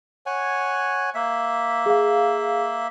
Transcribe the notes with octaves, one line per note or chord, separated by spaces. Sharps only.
C#5 F#5 G#5
A#3 E5
G#4 F5